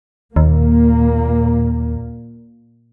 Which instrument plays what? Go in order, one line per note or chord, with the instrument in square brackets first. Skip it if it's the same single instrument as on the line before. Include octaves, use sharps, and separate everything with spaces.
[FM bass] D#2 [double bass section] A#2 A#3